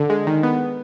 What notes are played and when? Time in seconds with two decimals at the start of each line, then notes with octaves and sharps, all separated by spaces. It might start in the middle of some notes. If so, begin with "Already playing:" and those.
Already playing: D3
0.10 G#3
0.27 D#3
0.43 B3